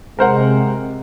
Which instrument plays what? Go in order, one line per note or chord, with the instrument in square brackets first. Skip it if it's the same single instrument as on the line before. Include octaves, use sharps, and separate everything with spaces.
[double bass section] C3 [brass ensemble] G#3 [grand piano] A#4 C5 F#5